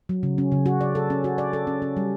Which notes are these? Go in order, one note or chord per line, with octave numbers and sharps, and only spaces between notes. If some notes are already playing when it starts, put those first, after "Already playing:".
F#3
C#3
C#4
C#3
F#4
D5
A4
C#4
F#4
D5
A4
C#4
C#4
G3